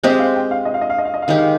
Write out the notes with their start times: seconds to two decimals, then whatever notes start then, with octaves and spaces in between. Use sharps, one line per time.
0.04 G#3 C4 G4 D#5
0.19 F5
0.35 G5
0.51 F5
0.65 D#5
0.74 F5
0.81 D#5
0.90 F5
0.98 D#5
1.05 F5
1.14 D#5
1.22 F5
1.28 D#3 G#3 D#4 G4 D#5
1.38 F5